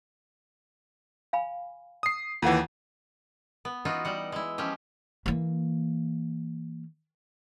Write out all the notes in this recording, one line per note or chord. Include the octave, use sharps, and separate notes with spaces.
F5 G#5 B5
D#6 C7
D#2 E3 F4 A4 F#5
B3
E3 D#4 F4 F#4
G3 F#5
G#3 E4
F3 G#3 C#4 G4
E3 A#3